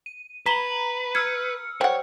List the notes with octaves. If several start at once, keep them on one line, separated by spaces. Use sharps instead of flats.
D#7
B4 A#5 B5 B6 E7 F#7 G7
E6 F6 G#6 C#7
G3 C5 C#5 F#5 G5